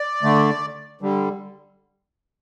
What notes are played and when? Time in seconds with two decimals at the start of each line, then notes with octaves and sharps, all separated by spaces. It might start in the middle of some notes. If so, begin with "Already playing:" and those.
Already playing: D5
0.23 D3 A3
1.01 D3 G3